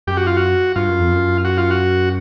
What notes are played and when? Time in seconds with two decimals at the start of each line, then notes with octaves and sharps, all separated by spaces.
0.07 F#2 G4
0.17 F#4
0.27 F4
0.37 F#4
0.76 G2 F4
0.88 F#2
1.00 F2
1.12 F#2
1.45 F#4
1.58 F4
1.70 F#4